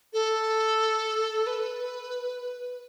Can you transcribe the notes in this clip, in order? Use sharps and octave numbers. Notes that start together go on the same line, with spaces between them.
A4
B4